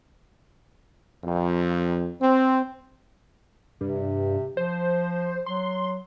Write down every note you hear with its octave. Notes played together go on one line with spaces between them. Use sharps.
F2
C4
G2 C3
F3 C5
F#3 C6